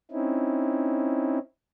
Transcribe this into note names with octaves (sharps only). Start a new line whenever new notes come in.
C4 C#4 D#4 E4